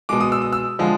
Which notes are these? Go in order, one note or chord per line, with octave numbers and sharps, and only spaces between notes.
B2 G#3 D6
D#6
E6
D#6
E6
D3 F3 G#3